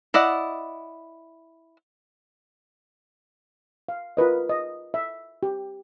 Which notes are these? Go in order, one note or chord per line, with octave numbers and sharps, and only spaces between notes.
E4 D5 D#5 F#5
F5
F4 A#4 B4 D#5
D#5
E5
G4